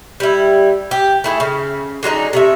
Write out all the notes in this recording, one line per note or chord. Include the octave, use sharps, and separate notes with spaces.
G3 E4
G4
A3 E4 G#4
C#3
D3 F#3 G#3 D#4
C3 A3 E5